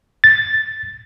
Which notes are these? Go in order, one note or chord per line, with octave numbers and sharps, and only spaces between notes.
A6